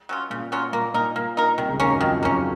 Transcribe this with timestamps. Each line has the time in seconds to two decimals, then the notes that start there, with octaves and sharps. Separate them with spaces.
0.09 F#3 C#4 F4
0.30 A#2 C#3
0.52 F#3 C#4 F4
0.73 A#2 A#3
0.94 A#2 D#4 A#4
1.16 A#2 A#3
1.37 D#4 A#4
1.58 C2 C3 D#3
1.69 C#2 C#3
1.79 D#2 D#3 A#3 C#4
1.90 F#2 F#3
2.00 F2 D#3 F3
2.22 F#2 F#3 A#3 C#4